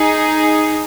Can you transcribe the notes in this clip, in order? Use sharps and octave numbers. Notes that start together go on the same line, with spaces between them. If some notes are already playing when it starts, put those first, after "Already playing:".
Already playing: D#4 G#4